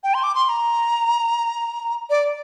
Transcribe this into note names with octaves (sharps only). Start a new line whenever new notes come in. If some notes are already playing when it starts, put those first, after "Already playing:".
G5
C6
D6
C6
C6
A#5
D5